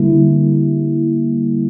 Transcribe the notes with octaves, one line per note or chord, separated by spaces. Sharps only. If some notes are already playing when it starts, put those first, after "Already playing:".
Already playing: D3 G3 A#3 E4